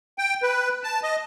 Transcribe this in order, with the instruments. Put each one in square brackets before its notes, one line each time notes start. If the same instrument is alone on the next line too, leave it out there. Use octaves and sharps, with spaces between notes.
[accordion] G5
B4
A5
D#5